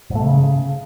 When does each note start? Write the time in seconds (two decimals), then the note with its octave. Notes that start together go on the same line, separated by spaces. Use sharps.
0.10 G#2
0.15 A3
0.21 C3
0.26 C#3